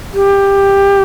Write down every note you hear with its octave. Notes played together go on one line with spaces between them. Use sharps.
G4